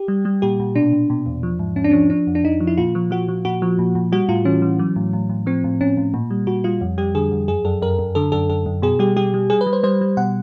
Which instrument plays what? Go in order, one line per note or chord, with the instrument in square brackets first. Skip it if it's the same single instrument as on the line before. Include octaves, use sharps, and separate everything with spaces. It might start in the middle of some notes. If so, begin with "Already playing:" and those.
Already playing: [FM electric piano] G4
G3
G3
A#2 G4
A#2
B2 D4
B2
B2
E2
F3
G#2
G#2 C#4
D4
F3 C#4
F3 D4
F2
D4
F2 D#4
F3
E4
A#2 F4
F3
F3 F#4
F3
A#2 F#4
F3
A#2
A#2
G3 F#4
A2 F4
E3 C#4
E3
F#3
A2
A2
A2
F3 C4
A2
A2 C#4
A2
A#2
G3
A#2 F#4
G3 F4
F2
G3 G4
D3 G#4
F2
F#2 G#4
F#2 A4
F#2 A#4
F#2
D3 A4
F#2 A4
F#2 A4
F#2
B2 G#4
G3 G4
G3 G4
G3
G3 G#4
B4
G3
C5
G3 C5
G3
B2 F#5